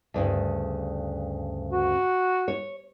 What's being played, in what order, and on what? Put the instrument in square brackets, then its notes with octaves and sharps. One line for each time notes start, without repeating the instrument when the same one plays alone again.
[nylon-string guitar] D2 G2 C#3
[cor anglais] F#4
[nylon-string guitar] C#5